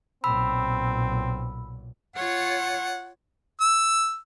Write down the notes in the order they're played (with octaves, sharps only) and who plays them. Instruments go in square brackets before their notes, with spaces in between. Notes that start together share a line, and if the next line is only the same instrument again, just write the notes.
[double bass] B1 A#2 [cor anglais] C4 [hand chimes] B5 E6
[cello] F4 C#5 [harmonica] F#5
[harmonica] E6